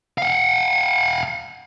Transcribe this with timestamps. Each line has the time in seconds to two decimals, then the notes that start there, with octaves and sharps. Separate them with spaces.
0.18 F5 F#5